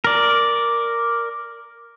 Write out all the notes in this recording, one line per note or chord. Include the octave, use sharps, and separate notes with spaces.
A#4 D5